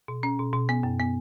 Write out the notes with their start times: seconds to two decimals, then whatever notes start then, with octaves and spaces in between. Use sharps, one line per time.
0.08 B2
0.23 C#4
0.39 B2
0.53 B2
0.69 B3
0.83 F#2
0.99 B3